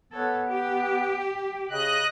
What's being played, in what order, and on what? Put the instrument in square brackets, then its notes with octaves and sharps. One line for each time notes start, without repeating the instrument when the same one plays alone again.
[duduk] B3 [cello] A4 C#5
[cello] G4
[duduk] C#3 [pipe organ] D#5 F#6